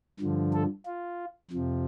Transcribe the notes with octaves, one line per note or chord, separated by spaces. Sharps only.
G2 D3 F3
A4
F4
F2 C3 F3